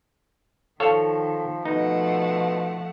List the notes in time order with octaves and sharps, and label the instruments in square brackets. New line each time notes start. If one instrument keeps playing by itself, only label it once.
[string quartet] D#3 [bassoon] F3 [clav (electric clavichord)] A4 C#5 F5
[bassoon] B2 [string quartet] F3 A3 F#5 [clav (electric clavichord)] D#4